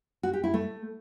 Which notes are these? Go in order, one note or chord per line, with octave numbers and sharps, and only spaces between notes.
F#4
G4
E4
A3